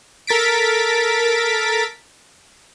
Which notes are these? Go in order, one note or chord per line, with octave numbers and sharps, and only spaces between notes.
A4 A#4 A6 B6 D7